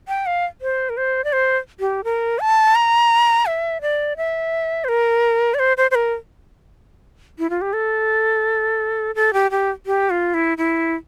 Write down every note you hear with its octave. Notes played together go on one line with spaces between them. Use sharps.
G5
F5
C5
A#4
C5
D5
C5
G4
A#4
A5
A#5
E5
D5
E5
C5
A#4
D5
C5
C5
C5
A#4
E4
F4
G4
A4
A4
G4
G4
G4
F4
E4
E4